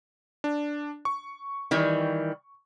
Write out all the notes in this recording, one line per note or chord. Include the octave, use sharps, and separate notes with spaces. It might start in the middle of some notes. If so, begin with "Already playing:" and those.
D4
C#6
D#3 E3 G3